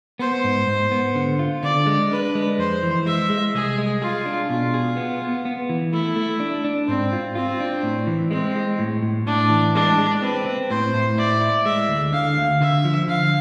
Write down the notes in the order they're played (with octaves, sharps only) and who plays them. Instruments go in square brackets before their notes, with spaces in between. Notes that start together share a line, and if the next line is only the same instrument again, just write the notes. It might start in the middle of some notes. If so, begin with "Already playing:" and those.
[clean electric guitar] B3 [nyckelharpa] C5
[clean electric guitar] G#2
G#2
B3
D3
F4
[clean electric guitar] D3 [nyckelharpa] D5
[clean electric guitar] G#3
[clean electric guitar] D4 [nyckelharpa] B4
[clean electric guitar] G#3
[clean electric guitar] F2 [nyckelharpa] C5
[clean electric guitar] E3
[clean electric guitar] G#3 [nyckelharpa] E5
[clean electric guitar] G#3
[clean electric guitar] C2 [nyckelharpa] G#4
[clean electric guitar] G#3
[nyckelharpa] F4 [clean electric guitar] G#4
[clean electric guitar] D4
[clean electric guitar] B2 [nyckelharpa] F4
[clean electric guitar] G#4
B3
B3
B3
E3
[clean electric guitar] A3 [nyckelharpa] E4
[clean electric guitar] A3
D4
D4
[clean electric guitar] G#2 [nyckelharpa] C4
[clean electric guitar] F4
[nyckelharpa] C4 [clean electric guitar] F4
[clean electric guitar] D4
A2
E3
[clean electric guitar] G#3 [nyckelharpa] C4
[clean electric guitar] G#3
A2
A2
[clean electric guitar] A2 [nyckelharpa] D4
[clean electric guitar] E3
[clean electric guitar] G#3 [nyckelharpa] D4
[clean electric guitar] G#3
[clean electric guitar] C4 [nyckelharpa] B4
[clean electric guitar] C4
[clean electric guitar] A2 [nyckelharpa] C5
[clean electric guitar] A2
[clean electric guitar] E4 [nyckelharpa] D5
[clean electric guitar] E4
[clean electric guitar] G#3 [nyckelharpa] E5
[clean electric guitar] D2
[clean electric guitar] D3 [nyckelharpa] F5
[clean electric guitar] D2
[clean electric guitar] D3 [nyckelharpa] E5
[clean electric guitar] F3
[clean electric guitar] D3 [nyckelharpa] F5